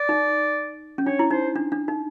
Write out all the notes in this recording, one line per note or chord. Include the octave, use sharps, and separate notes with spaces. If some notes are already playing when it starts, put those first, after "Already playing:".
Already playing: D5
D#4
C#4
D4 C#5
E4
D#4 C5
D4
D4
D#4